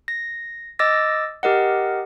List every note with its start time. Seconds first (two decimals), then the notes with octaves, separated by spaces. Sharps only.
0.08 A#6
0.79 D#5 D6 E6 A6 A#6
1.43 G4 A#4 D#5 F#5